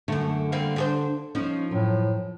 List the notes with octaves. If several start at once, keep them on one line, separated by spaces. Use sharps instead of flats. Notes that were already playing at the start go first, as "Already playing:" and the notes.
F#2 D3 A3
G3 A#3 C4
D4 G#4 C5
F3 C#4 D#4
F#2 A2